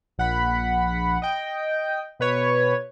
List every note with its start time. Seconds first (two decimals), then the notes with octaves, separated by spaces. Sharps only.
0.18 A#1 F#5 B5
1.22 D#5 G5
2.19 B2 B4 C#5